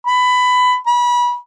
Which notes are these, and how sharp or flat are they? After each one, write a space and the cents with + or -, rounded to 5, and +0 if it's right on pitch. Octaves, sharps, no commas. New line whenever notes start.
B5 +15
B5 -30